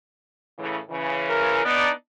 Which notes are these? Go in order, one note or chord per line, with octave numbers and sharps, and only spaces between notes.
A2 C#3 E3
C#3 E3
A#4
B3 D4 D#4 D5